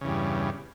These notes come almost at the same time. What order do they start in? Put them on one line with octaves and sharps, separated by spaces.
C#3 E2 G2